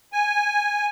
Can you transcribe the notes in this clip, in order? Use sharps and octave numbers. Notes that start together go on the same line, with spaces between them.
G#5